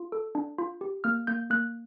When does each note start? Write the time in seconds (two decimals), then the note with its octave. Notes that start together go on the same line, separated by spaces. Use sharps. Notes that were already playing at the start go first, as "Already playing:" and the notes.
Already playing: F4
0.12 A4
0.35 D4
0.58 F4
0.81 G4
1.04 A#3 F6
1.27 A#3 G6
1.50 A#3 F#6